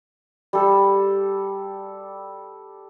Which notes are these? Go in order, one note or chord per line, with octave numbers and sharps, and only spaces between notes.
G3 A4